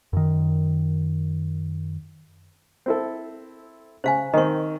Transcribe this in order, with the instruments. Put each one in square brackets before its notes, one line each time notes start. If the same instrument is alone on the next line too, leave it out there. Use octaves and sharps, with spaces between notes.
[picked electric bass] F#2 D#3
[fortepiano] C4 E4 A4
[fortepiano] C#3 [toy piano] C5 F5 G#5
[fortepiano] D#3 C4 [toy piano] D#5 C#6